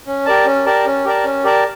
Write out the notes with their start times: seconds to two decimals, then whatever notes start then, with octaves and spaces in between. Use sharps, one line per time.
0.07 C#4
0.26 G4 A#4 D5 A5
0.45 C#4
0.66 G4 A#4 D5 A5
0.86 C#4
1.05 G4 A#4 D5 A5
1.24 C#4
1.44 G4 A#4 D5 A5